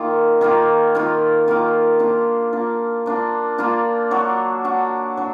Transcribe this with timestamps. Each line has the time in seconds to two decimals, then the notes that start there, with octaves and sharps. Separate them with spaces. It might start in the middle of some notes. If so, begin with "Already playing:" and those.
Already playing: D#3 A#3 F4
0.41 D#3 A#3 F4
0.95 D#3 A#3 F4
1.48 D#3 A#3 F4
1.99 A#3 D4 F4
2.53 A#3 D4 F4
3.06 A#3 D4 F4
3.58 A#3 D4 F4
4.11 F#3 D4 F#4
4.64 F#3 D4 F#4
5.17 F#3 D4